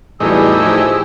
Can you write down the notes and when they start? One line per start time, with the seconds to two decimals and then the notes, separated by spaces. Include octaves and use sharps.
0.20 E2 A2 F#3 G3 D#4 G#4 G#5 E6
0.62 F3 E4 G4